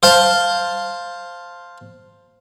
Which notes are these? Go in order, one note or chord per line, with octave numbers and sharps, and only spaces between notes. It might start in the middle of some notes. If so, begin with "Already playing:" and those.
C5 F5 A5